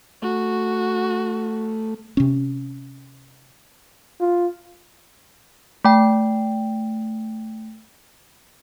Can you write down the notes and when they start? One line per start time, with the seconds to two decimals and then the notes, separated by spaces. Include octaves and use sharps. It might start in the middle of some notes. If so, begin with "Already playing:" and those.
0.23 A3 F#4
2.17 C3 C#4
4.21 F4
5.85 A3 G5